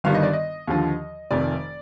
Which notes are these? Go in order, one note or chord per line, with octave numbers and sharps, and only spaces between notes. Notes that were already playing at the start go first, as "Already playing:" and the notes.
G1 G2 D#3 G3 F5
D#5
D5
D#5
D#2 D3 F3
F1 F2 D#3 D5